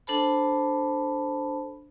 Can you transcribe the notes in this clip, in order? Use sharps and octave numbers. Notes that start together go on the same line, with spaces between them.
D4 A4 C5 A5 B5